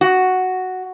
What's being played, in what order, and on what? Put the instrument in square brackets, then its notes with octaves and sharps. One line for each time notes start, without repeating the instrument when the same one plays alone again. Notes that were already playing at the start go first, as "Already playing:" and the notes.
[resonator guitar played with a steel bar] F#4